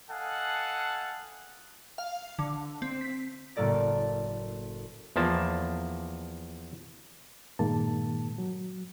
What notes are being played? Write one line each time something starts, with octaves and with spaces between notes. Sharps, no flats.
A4 D#5 F5 F#5 G#5 A5
F5
D3
C4
B6
F#1 A2 A#3 A4 D5 A#6
E2 F3 A#3 A5
G2 A#2 D#3 G#3 A#3 A5
F#3